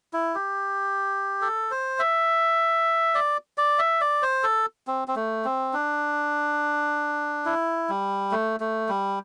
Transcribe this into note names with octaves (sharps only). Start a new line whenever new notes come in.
E4
G4
A4
C5
E5
D5
D5
E5
D5
C5
A4
C4
C4
A3
C4
D4
E4
G3
A3
A3
G3